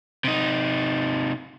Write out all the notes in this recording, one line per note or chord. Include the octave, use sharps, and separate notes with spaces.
C3 D#4